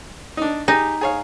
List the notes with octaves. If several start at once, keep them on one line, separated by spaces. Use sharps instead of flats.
D4 D#4
D#4 G4 G#4
G#4 C#5 F5